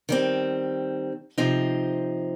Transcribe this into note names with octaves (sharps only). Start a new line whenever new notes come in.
D#3 G3 C4
C3 F3 C4 D#4